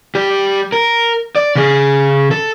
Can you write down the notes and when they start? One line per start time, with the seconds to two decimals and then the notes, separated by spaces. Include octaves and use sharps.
0.15 G3 G4
0.72 A#4
1.36 D5
1.56 C#3 G#4
2.31 A4